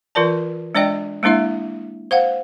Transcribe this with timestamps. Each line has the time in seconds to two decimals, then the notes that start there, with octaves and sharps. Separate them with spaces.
0.15 E3 F4 A#4 D5 A5
0.75 G#3 D4 D5 D#5 G5
1.23 G#3 A#3 D4 E4 E5
2.11 C5 F5 F#5